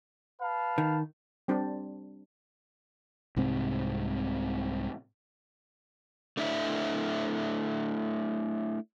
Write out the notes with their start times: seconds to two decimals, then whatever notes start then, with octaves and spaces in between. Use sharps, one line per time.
0.42 B4 F5 A5
0.78 D#3
1.48 G3 C4 D4 G4
3.36 C2 G#2 C3 C4
6.37 A3 D4 E4 E5